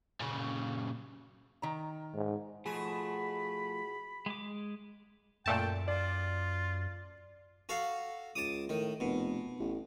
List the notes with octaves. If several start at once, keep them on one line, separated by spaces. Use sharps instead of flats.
A#2 C#3
D#3 A#5
G#2
B2 F3 A3 G#4 B5
G#3 D6
F#2 A#2 A3 G5 A5
F4 D5
F#4 A4 F5
C#2 A5 D6 D#6
A2 D#3
F1 B2
A1